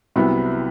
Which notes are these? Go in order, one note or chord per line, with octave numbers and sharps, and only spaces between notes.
C2 C3 F#3 B3 E4